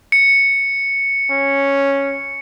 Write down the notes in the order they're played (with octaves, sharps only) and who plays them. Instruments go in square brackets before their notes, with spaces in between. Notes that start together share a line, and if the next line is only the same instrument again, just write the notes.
[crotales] C#7
[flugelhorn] C#4